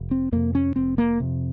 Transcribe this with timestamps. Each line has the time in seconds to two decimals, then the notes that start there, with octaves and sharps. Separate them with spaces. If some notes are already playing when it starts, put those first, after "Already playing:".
Already playing: F1
0.11 C4
0.32 F2 C3 A#3
0.55 C#4
0.76 F1 C4
0.98 A#3
1.20 F2 C3